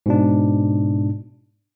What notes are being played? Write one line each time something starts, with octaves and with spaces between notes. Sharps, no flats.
G#2 B2 D4